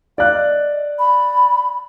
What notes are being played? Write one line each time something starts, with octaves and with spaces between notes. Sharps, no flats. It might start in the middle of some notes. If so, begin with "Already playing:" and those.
D5 F5 F#6
D#5
B5